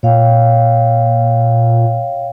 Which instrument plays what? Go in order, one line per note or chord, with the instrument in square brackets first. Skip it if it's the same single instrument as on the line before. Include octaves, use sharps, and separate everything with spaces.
[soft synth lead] A#2 [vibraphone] C#5 F5 G5